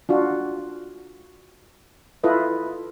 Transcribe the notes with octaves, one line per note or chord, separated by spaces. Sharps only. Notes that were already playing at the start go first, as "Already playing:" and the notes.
D4 F4 F#4
E4 F4 A4 B4 D#5